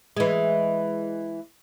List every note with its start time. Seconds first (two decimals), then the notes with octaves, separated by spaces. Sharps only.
0.16 E3 G#3